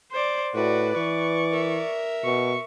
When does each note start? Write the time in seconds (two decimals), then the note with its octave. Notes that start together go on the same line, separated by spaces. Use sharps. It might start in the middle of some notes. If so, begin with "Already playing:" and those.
0.12 C5 D5
0.55 A2 F#4 B4 D5
0.96 E3 D5 C#6
1.52 A#4 E5
2.25 B2 C#6